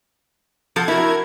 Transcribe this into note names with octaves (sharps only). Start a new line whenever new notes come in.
F3 A4 F#5 G#6
E4 F#4 A#4 G#6